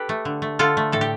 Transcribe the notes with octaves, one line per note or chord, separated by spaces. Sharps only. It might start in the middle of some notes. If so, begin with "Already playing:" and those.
Already playing: G4 A4 B4
A3
D3
A3
D3 F4 A4
A3
A2 A4
G4